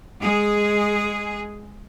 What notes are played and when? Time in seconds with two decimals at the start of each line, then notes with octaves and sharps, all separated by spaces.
0.20 G#3 G#4